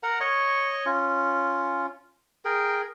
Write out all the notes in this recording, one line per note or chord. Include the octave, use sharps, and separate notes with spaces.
A#4 F#5 A#5
C#5 D#5 C#6
C#4 F4
G#4 A#4 G5